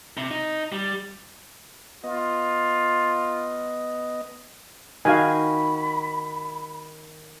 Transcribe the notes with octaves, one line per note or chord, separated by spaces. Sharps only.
C3
D#4
G3
B3 F4 D#5
D#3 F#4 F5 G#5 B5